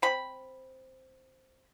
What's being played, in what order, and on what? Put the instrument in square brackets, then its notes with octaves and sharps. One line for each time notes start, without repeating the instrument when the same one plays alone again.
[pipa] C4 B5